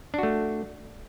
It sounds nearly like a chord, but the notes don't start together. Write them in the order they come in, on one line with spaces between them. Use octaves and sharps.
D4 F#4 A3